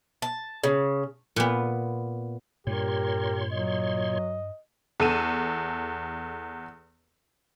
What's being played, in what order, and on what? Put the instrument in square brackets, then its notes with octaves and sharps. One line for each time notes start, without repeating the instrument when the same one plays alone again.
[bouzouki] A5
C#3
[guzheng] A#2 B3
[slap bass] G2 [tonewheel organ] A#2 C#5 C6 [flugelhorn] G4 [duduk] A#4
[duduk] F#3 [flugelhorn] D#5
[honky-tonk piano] E2 A4 D#7 E7